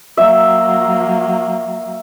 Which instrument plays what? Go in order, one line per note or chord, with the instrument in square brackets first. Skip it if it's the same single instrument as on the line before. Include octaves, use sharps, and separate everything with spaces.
[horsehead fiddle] F#3 A#3 [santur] E5